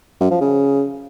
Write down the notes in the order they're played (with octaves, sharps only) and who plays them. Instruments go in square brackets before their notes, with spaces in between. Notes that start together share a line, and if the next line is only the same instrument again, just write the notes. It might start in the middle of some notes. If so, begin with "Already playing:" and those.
[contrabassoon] F#2
F3
C#3